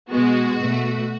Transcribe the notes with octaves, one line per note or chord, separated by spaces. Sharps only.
B2 G#3 B3 F#4
B2 A3